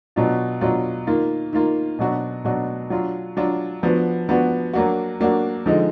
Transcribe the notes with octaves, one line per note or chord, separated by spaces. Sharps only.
B2 F#3 D4 F4
B2 F#3 D4 F4
D#3 A#3 F4
D#3 A#3 F4
B2 F#3 D4 F#4
B2 F#3 D4 F#4
F#3 D4 F4
F#3 D4 F4
F3 B3 D4 F#4
F3 B3 D4 F#4
F#3 A#3 D4 F#4
F#3 A#3 D4 F#4
D3 F3 G#3 D#4